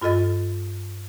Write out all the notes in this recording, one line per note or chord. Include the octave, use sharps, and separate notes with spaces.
G2 F4 A4 D#5 A6